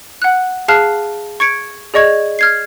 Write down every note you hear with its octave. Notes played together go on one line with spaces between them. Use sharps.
F#5 F#6
G#4 F5 A5 F6 F#6 C7
C#6 G#6 C#7 D7
G#4 D5 D#5 C#6 G#6
F6 G#6 C7